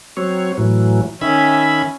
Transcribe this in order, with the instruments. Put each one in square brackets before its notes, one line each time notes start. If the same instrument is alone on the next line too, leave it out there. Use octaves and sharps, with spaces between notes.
[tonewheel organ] F#3 C4 C#5
A2 E3 F#3
[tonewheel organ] D#3 E5 B5 [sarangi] C#4